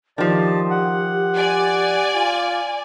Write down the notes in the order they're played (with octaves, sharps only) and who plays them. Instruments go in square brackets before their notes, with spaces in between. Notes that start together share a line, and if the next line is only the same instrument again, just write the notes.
[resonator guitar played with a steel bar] D#3 F3 [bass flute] G4 [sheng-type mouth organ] D5 A5
[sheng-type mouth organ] F#5
[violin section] D5 G#5
[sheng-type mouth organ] F4